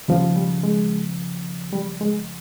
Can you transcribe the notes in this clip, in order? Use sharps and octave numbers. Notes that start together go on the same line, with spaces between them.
D#2 C#3 F3 G3
G3
G#3
G3
G#3